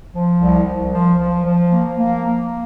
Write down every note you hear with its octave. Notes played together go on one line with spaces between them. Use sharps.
F3
C2
C2
F3
F3
F3
A#3
A#3
A#3